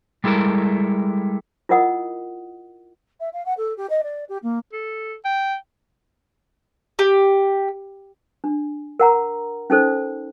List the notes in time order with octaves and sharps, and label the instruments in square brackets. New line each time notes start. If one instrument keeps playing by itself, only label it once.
[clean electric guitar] G3 G#3 E4 A4 A#4
[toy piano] E4 F4 A#4 D#5 F#5 D#6
[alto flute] E5
F5
F#5
A4
G4
D#5
D5
G4
A#3
[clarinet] A4
G5
[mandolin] G4
[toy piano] D4
A#4 F#5 A#5
C#4 D#4 A4 C5